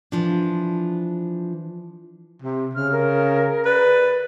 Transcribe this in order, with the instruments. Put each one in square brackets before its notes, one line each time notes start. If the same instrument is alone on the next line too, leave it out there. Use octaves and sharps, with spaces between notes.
[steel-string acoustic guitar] E3 F3 D4
[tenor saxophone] C3
[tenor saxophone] C#3 [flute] F6
[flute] A#4
[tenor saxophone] B4 [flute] D5